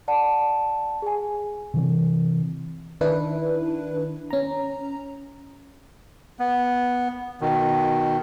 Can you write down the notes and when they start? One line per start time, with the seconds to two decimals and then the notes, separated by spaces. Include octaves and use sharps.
0.08 D5 F#5 A5
1.02 G#4 G#5
1.74 C3 E3 C4
3.01 D#3 D4 E4 B4
4.31 C#4 A#5
6.39 B3
7.41 B2 D#3